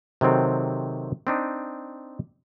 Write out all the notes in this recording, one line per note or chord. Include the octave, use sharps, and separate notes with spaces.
C3 D#3 F#3 C4 A4
C4 D4 D#4